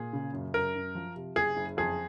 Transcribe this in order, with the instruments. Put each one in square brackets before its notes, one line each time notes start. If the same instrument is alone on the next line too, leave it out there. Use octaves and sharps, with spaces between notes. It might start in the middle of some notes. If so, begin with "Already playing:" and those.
Already playing: [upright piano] A#2 [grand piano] G#4
[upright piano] C#3
F#2
[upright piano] F#2 [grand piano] A#4
[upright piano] F#2
F3
C3
[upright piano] F#1 [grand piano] G#4
[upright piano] F#1
[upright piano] F2 [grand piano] G#4